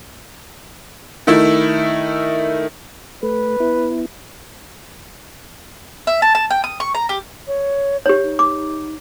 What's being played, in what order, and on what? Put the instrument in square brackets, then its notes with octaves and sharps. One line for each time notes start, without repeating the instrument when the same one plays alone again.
[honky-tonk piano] D#3 A3 E4
[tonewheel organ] A3 [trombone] B4
[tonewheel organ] B3 E4
[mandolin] E5
A5
A5
G5
D#6
C#6
A#5
G4
[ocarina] C#5
[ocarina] D#4 [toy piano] G4 C#5
[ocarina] D#4
[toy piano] D6